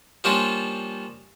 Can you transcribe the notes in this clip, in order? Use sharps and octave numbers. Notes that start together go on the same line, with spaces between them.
F3 G3 A#3 C#4 D4 F4